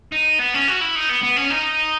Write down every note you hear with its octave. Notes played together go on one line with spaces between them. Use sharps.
D#4
B3
C#4
F#4
E4
D#4
B3
B3
C#4
D#4